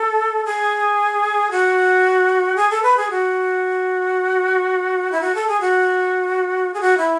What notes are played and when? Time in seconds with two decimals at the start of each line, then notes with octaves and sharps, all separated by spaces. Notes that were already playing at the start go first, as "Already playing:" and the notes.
Already playing: A4
0.46 G#4
1.51 F#4
2.56 G#4
2.70 A4
2.83 B4
2.97 G#4
3.10 F#4
5.12 E4
5.21 F#4
5.35 A4
5.48 G#4
5.61 F#4
6.74 G#4
6.81 F#4
6.98 E4